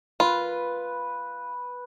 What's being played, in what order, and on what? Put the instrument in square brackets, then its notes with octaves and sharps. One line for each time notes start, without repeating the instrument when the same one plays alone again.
[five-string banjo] F4 [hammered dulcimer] B4